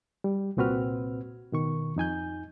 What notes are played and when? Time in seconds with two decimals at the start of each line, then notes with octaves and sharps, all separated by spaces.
0.24 G3
0.57 C2 A#2 C4 F#4 B4 F6
1.52 B2 D#3 C#6
1.96 F2 D#4 G#5 G6